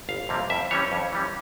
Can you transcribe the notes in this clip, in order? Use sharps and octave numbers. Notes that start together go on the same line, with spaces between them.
G1 F5
F2 C3 G3 A#3
F2 E5
E3 G3 C#4 C#5
F2
E3 G3 C#4